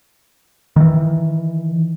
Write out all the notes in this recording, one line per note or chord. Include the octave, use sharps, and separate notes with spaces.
D#3 E3